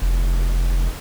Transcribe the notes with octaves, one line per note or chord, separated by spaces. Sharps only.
F1